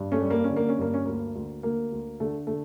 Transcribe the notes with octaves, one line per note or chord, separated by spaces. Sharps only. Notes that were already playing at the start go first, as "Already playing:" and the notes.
Already playing: G2
A3 C#4
G3
A#3
C#4
D3
A#3
C#4
G2 A#3
C#4
D2 A#3
D2
D2 A#3
D2
D3 A3
D3 A3